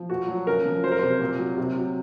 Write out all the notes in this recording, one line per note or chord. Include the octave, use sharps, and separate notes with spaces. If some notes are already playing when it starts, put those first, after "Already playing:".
Already playing: F3
A#2 F#4
F#3
C#3 A#4
F3
F#3 C5
A#4
C3 C5
A#2
F#3
C3
F#3